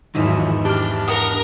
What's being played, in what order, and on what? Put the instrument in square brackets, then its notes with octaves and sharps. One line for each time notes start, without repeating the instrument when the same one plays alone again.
[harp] E2 G#2 E6 [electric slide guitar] D#3 F3 F#3 [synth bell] D#4 E4
[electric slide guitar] D4 D#5 A5 [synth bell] G4 D6 F6
[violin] A#4 [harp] F#5 [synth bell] D#6